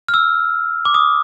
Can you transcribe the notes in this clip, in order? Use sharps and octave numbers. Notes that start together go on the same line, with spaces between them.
F6
E6
D6
D#6